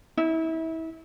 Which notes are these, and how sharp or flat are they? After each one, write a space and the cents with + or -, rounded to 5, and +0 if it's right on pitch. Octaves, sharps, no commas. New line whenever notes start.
E4 -30